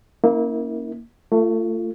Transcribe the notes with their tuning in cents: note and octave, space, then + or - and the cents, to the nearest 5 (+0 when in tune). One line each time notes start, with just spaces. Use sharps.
A#3 +0 C#4 +0 E4 -35
A3 +25 F4 -20